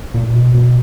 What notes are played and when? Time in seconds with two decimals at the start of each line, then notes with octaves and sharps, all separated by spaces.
0.14 A#2
0.35 B2
0.55 B2